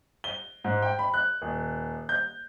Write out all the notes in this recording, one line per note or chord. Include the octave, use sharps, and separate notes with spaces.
G7
G#2
G5
B5
F#6
D#1
G6